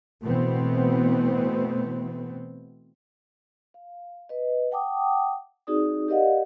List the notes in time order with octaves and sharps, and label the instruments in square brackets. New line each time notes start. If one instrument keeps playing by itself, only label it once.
[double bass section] B2 E3 A3 B3 C4
[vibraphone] F5
B4 D#5
F#5 G5 A5 D6 D#6
C4 D#4 F#4 G#4 D5 D#6
G4 A#4 D5 D#5 F5 F#5